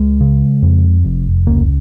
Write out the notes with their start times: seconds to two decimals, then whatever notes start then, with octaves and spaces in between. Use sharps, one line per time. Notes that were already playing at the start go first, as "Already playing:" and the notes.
Already playing: C#2 G#3
0.21 C#3
0.62 F2
1.04 F1
1.47 C#2 A#3